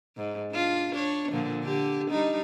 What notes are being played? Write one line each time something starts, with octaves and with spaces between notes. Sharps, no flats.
G#2
D4 F4
D4 C#5
A#2 D3 F3
D3 G4
G3 D4 D#4